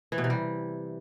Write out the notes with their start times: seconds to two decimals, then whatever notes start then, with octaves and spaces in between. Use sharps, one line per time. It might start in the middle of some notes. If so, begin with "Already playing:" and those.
0.12 E3
0.18 B2
0.24 C3
0.30 G3